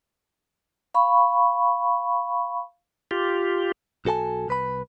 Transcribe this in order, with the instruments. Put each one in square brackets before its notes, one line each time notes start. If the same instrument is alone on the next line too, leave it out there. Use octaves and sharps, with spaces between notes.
[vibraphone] F5 B5 C#6
[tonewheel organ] F4 G4
[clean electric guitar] B1 F#4 A4 G#5 A5
C2 B4 B5